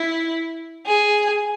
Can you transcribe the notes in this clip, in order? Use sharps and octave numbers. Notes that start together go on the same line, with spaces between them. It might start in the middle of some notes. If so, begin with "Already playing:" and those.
Already playing: E4
G#4